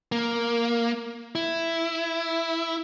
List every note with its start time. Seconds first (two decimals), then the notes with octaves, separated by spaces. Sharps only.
0.12 A#3
1.35 E4